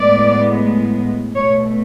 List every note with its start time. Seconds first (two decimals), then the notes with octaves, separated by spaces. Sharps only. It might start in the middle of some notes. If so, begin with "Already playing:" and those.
Already playing: A2 G#3 B3 D5
1.35 B2 A3 C#5